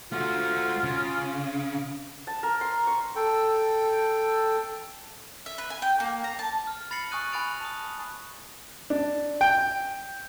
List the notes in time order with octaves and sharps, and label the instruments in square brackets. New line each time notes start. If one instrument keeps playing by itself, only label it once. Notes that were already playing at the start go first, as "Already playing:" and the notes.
[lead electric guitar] A3 F#4 [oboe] F4
[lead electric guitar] C#3
[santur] A5
A#4
C6
C#6
[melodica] A4 G5
[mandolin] E5
B4
G#5
G5
A#3
A#5
A5
[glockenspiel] F6
B5 A6 A#6 C7 C#7 F#7
G#5 C#6 D#6 F#6 D#7 F#7
G#5 B5 F#6 A6 D7 F7
A5 D#6
[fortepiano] D4
G5